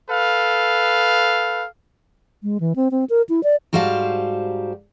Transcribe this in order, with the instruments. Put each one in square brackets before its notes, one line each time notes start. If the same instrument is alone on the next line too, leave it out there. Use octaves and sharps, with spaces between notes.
[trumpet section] A4 B4 F5
[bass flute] G#3
E3
C4
C4
A#4
E4
D5
[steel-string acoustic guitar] G#2 G3 F#4 C5 F5 A5